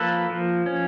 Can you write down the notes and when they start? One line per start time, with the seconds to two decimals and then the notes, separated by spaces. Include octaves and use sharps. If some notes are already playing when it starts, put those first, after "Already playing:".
Already playing: F3 A#3 A4 B4
0.30 F3
0.66 C#4